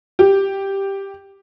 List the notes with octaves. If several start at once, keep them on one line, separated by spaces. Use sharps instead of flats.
G4